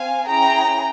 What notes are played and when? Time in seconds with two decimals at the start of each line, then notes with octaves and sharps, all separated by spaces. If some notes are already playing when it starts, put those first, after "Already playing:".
Already playing: C4 F5 G#5
0.28 C#4 E4 G#4 G5 A#5